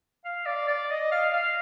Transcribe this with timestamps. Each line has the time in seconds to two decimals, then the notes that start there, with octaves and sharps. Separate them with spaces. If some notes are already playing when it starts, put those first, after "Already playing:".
0.25 F5
0.46 D5
0.68 D5
0.90 D#5
1.11 F5
1.33 F5